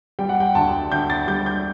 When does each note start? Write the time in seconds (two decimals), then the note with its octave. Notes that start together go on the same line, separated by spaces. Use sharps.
0.19 G3 G5
0.29 F#5
0.40 G5
0.55 D2 A5
0.92 D2 G6
1.10 A6
1.27 G3 G6
1.46 G6